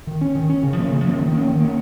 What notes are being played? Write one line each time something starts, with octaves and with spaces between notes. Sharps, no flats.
D#3
C#4
D#3
C#4
C#3
F3 A#3 C#4
C#3
F3 A#3 C#4
D#3
A#3 C#4
D#3
A#3 C#4